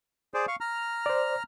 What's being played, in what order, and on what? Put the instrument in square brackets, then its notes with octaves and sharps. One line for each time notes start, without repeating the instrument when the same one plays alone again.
[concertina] G#4 C5 D5
F5 C#6
A#5 F6
[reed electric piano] C5 D5